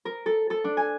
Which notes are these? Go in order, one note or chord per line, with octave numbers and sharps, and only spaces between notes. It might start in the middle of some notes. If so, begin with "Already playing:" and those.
A#4
A4
A4
D4
G#5